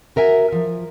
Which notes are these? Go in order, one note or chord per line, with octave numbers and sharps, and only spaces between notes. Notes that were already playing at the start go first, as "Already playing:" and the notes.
F#4 A#4 E5 G5 G#5
F3